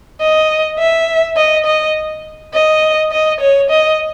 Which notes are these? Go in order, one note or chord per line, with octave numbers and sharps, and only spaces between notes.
D#5
E5
D#5
D#5
D#5
D#5
C#5
D#5